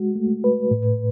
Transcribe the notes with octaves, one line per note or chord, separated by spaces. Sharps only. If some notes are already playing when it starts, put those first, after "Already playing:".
Already playing: G#3 F#4
A3
B4
A2